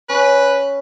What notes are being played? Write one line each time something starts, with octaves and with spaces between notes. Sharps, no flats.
C#4 B4